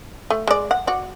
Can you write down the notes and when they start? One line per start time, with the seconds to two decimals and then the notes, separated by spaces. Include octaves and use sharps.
0.30 A3
0.48 G#3 D5
0.71 F#5
0.87 F#4 D5